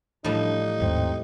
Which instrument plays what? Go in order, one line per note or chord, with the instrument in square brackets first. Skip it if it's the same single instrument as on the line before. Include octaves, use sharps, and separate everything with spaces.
[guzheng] A2 F3 G3 [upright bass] E3 [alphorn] D4 [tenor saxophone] D#4
[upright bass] D#2 G#2 [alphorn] C4